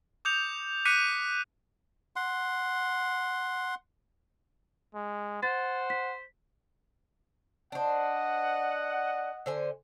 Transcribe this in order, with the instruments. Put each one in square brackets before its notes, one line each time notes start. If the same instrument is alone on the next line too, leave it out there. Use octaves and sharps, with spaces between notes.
[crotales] D6 D#6 G6 C#7 F7
D6 F#6 B6 C#7 D#7
[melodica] F#5 C6
[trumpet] G#3
[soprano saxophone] C5 [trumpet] F#5 [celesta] A6
[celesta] B6
[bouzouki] D4 C5 [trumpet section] D#5 F#5
[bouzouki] D3 C5 G#5